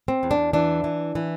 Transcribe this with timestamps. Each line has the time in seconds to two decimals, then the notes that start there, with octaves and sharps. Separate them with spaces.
0.08 C4
0.23 E2
0.31 D4
0.53 E3 D4
0.84 E3
1.15 E3